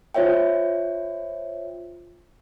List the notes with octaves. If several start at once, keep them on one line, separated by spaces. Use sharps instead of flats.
F4 C5 C#5 E5 G5